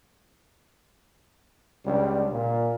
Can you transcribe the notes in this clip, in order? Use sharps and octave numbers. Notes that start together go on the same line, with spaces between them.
C#2 G3 D4
A#2